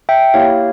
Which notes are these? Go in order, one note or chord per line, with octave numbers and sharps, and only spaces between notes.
E5 G5
A#3 E4 G4 C#5 F5